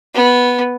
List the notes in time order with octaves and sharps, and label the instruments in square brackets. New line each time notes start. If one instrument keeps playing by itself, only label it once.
[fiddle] B3